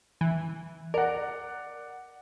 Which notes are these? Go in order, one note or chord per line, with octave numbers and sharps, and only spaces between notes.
E3
A#4 D5 F#5